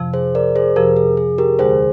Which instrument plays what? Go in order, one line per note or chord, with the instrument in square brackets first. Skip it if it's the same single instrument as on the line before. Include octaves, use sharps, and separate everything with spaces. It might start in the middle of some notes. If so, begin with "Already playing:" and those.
Already playing: [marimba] F2 C3 F3
[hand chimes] G#4 C5
A#4 D5
G#4 C5
[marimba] F2 C3 F3 [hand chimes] G4 A#4
[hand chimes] G#4
G#4
G4 A#4
[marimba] D#2 D3 G#3 [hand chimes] G#4 C5